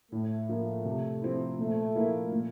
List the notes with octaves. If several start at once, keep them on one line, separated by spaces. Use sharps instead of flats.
A2 A3
F3 A#3
C3
F3 C4 E4
A#2 A3
F3 A#3 E4
A#2